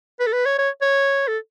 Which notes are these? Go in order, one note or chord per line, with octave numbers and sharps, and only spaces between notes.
B4
A4
B4
C#5
C#5
C#5
A4